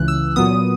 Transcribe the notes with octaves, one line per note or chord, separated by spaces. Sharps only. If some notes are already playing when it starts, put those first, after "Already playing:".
Already playing: C#2 C#3 E3 F#6
E6
A#2 F#3 B3 D#6